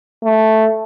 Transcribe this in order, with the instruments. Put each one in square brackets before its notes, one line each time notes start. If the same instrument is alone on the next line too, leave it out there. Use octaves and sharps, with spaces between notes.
[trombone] A3